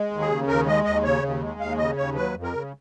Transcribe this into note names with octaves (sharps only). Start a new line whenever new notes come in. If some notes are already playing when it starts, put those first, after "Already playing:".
Already playing: G#3
D#2
G#4
C#3
D#2 A#4
G#3 D#5
D#2 D#5
C#3 C#5
D#2
G#3
D#2 F5
C#3 D#5
D#2 C#5
F#3 B4
F2
A#4
C#3